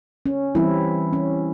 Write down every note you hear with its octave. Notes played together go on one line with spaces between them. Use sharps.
C#4
E3 G3 C4 E4
C#4